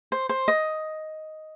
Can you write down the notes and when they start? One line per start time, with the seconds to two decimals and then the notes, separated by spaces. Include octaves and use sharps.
0.12 C5
0.29 C5
0.48 D#5